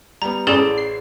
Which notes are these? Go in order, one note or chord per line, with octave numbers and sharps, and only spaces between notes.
G3 B3 A#5
A1 C#4 G#4 A4 D5 B5 E7 G7
C7